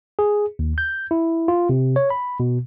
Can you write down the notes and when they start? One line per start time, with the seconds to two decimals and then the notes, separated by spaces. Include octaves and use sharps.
0.19 G#4
0.59 D#2
0.78 G6
1.11 E4
1.48 F4
1.69 C3
1.96 C#5
2.10 B5
2.40 B2